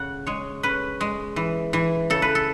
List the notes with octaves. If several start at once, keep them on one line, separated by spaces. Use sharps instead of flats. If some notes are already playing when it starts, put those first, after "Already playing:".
Already playing: C#3 F#5
G#3 C#5
C#4 B4
G#3
E3
E3
C#3 A4
B4
A4